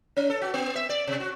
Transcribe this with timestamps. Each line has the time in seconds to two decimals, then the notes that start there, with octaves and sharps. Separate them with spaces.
0.17 C#4
0.30 A4
0.42 F#4
0.54 B3
0.76 E5
0.89 D5
1.07 C3
1.20 F#4